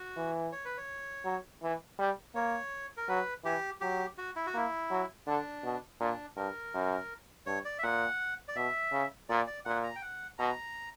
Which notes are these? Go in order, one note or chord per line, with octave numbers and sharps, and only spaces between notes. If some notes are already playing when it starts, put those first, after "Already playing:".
Already playing: F#4
E3
C#5
B4
C#5
F#3
E3
G3
A#3 C#5
A#4
F#3 B4
E3 G4
F#3 G4
F#4
E4
F#4
A#3 E4
F#3
D3 D4
B2
A#2 D4
G2 A#4
F#2
G2 C#5
D5
E5
A#2 F#5
D5
B2 E5
C#3
A#2 D5
D5
A#2 F#5
A#5
G5
F#5
B2 A#5